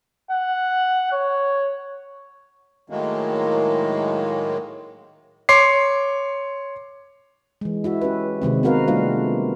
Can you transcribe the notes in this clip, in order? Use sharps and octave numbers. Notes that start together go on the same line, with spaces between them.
F#5
C#5
A2 D#3 F#3 G#3 A#3
C#5 C6 D6 C7
E3 G#3
E4 F#4 E5
C#4 G4 B4
C3 D#3 G#3 C4
B3 C4 F#4 A#4 B4 F5
G3 A3 B3 D4 F4 F5